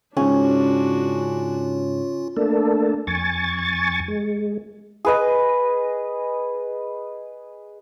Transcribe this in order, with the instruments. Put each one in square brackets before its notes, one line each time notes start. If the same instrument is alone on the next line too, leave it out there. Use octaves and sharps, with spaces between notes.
[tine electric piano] G#2 C#3 [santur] C#4 [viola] D4 F#4 [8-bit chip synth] F4
[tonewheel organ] A3 A#3 D4 A4
F2 G#5 C#6 A6
G#3
[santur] G#4 B4 D#5